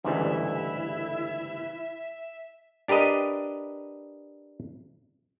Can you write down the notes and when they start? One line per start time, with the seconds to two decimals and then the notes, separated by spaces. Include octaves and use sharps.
0.05 G1 D2 G#2 C#3 E3 G3 E4 E5
2.88 D4 G4 A#4 B4 D#5